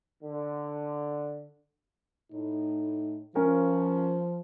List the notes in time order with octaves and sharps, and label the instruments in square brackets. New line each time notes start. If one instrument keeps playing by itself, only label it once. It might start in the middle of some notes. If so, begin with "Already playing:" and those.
[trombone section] D3
[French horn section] A2 D#4
[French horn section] F3 [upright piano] C#4 A#4